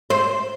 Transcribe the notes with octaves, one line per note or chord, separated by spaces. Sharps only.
C5